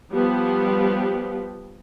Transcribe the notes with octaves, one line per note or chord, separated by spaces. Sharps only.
F3 G3 B3